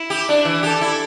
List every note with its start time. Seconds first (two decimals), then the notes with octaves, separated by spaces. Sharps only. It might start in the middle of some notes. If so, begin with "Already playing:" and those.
Already playing: E4
0.10 G4
0.29 D4
0.45 E3
0.63 G4 A4
0.81 E4